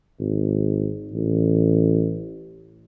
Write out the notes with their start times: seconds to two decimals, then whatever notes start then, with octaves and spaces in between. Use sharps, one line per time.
0.20 G#1
1.13 A1